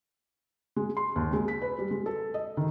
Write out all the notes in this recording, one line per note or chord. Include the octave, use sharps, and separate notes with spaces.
G#3
C6
D#2
G#3
B6
B4
G3
G#3
A4
D#5
D#3